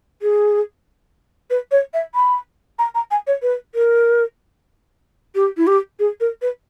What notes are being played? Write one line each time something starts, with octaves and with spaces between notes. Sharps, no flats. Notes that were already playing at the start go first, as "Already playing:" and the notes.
G#4
B4
C#5
E5
B5
A#5
A#5
G#5
C#5
B4
A#4
G4
E4
G4
G#4
A#4
B4